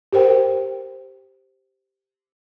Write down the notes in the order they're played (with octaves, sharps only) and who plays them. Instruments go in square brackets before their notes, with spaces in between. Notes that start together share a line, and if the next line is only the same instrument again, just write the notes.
[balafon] G4 A#4 C5 G5